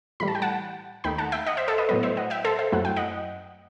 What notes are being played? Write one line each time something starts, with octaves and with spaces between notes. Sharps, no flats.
A2 E3 G3 B5
A5
G5
F#5 A5
D#2 D#3 A3 D#4 G5 B5
F#5 A5
E5 G5
D#5 F#5
C5 E5
A4 C5
B4 D#5
A2 F#3 B3 B4 D#5
C5 E5
D#5 F#5
E5 G5
A4 C5
C5 E5
F#2 F#3 A3 E4 F#5
G5
D#5 F#5